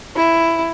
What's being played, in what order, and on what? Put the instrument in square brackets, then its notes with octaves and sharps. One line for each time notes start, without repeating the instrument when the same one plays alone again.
[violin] E4